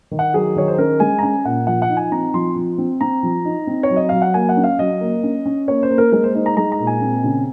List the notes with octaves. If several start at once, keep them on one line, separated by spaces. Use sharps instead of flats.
D#3
F#5
F#3 G#4
D#3 C#5
C5
C#4 A#4
G#3 G#5
A#5
C#4 G#5
A#2 F#5
F3 F#5
F#5
D#4
G#5
C4 A#5
F3 C6
F3
C4
C4 A#5
F3
D#4
C4
C#5
F#3
D#5
F#3 F5
F#5
A#3 G#5
F#5
C#4
F5
F#3 D#5
A#3
C#4
C#4
A#3 C#5
C5
A#3
A#4
G#3 A#4
C5
D#4 C5
A#5
G#3 A#5
A#5
A#2
G#5
C4
C#3